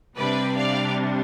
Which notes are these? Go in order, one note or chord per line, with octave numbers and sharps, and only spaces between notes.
C3 G3 D4 B4 D5
D5 F5